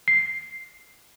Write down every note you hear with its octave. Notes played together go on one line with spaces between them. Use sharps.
C7